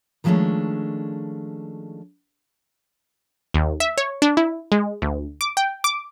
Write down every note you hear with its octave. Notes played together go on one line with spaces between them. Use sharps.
D#3 F3 G#3 A3 C#4 D4
D#2
E5
C#5
D4
E4
G#3
D2
D6
G5
D6